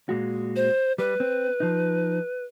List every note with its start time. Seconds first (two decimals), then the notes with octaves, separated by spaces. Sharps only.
0.09 A#2 G#3 F#4
0.56 C5
0.98 G3 B4
1.20 C4
1.60 F3 D#4